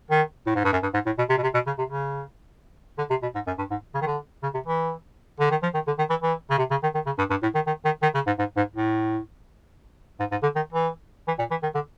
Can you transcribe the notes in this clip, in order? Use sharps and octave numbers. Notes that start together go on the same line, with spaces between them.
D#3
A2
G#2
G2
F#2
G2
G#2
A2
B2
C3
B2
C3
B2
C#3
C3
C#3
D3
C3
B2
G#2
F#2
G2
G#2
C#3
D#3
D3
C#3
C3
E3
D3
D#3
F3
D#3
D3
D#3
E3
E3
C#3
C3
C#3
D#3
D#3
C#3
G2
G2
A2
D#3
D#3
D#3
D#3
C#3
G#2
G#2
G#2
A2
G#2
G#2
D3
D#3
E3
E3
A#2
E3
D#3
D3